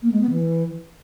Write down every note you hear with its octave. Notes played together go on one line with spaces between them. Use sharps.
A#3
G#3
B3
E3